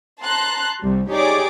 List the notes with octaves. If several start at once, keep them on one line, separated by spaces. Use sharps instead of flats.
A5 A#5 C6 F#6
C2 G3
D#4 G4 G#4 C#5 D5 D6